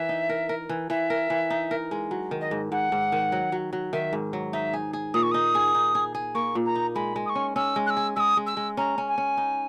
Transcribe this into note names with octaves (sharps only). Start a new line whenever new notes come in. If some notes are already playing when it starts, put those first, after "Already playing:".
Already playing: E3 A#4 E5
D#4
A#4
A#4
E3
E3 E5
A#4
E3
D#4
A#4
G#3
F#3
D#3
D#5
G#2
G#2 F#5
G#2
D#3
F#3
F#3
F#3
D#3 E5
G#2
F#3
D#4 E5
G#4
G#4
A#2 D#6
C#6
D#4 D#6
G#4
D#4
G#4
G#4
A#3 C#6
A#2
A#5
D#4
G#3 B5
G#3
D#6
C#6
C#4
C#4 E6
G#3
F#6
E6
G#4
G#3 D#6 E6
G#3
E6
G#3
C#4 A#5
C#4
G#5
C#4
D#4